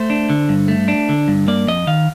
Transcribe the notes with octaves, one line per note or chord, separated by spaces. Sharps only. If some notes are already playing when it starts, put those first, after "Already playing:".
Already playing: A3 C5
D4
D3
G2
A3
D4
D3
G2
A#3 D5
F2 D#5
D#3 F5